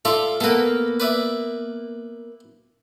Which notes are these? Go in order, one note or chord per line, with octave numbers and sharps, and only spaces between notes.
F4 A4 D5 E5
A#3 B3 A4 B4
B4 D5 E5